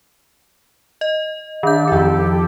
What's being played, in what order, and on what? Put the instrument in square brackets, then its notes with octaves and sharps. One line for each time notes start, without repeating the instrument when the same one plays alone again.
[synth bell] D#5
[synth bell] D#3 G6 [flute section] D4 E5 D6
[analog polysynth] F2 A4 [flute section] D#4 E4 G4